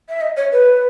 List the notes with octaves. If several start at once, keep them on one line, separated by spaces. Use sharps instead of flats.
E5
D#5
C#5
B4